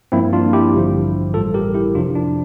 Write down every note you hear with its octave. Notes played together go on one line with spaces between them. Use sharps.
G2 F3 A#3 C4 E4
D4 F4
E4 G4
A1 G2 D3 F3
A1 A2 G3 F4 A4
G4 A#4
E4 G4
F2 C3 F3 D4 F4
D4